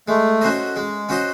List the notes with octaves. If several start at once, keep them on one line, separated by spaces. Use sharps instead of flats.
G#3 A3
C#4 F#4 C5 D#5
G#3
C#4 F#4 C5 D#5